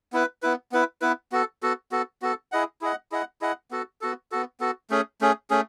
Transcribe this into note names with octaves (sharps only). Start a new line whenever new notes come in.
B3 E4 B4
B3 E4 B4
B3 E4 B4
B3 E4 B4
B3 F#4 A4
B3 F#4 A4
B3 F#4 A4
B3 F#4 A4
E4 G#4 D#5 F#5
E4 G#4 D#5 F#5
E4 G#4 D#5 F#5
E4 G#4 D#5 F#5
B3 F#4 A4
B3 F#4 A4
B3 F#4 A4
B3 F#4 A4
A3 C#4 G#4
A3 C#4 G#4
A3 C#4 G#4